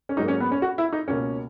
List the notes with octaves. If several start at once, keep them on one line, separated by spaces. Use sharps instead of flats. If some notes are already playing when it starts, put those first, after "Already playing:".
C#4
G#2 F#3 A#3 D#4
C#4
B3
C#4
F#4
E4
D#4
C#2 B2 A#3 C#4